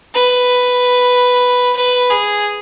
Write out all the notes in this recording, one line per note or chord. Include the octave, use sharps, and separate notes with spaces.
B4
B4
G#4